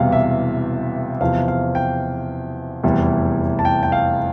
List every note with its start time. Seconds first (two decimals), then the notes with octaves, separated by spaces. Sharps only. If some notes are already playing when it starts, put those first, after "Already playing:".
Already playing: E1 E2 C3 G3 F5
0.12 E5
1.21 E2 C3 F3 F5
1.48 F5
1.75 G5
2.84 F1 E2 E3 G3
3.59 A5
3.65 G5
3.83 G5
3.92 F5